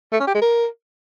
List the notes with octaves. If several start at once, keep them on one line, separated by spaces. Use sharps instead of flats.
A3
C#4
G4
G#3
A#4